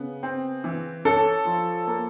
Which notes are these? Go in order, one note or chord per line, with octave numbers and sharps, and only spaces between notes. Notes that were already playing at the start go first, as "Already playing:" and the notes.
Already playing: C#3 B3
C4
E3
C#4 A4
F3
A#3